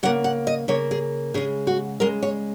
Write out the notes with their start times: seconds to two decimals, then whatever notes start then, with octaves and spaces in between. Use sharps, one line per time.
0.03 C#3 A#3 F#5
0.24 F#5
0.47 D#5
0.68 C#3 A#3 C#5
0.91 G#4
1.34 C#3 G#3 G#4
1.67 F#4
2.00 C#3 G#3 A#4
2.23 C#5